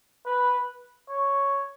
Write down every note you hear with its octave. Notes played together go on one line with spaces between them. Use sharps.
B4
C#5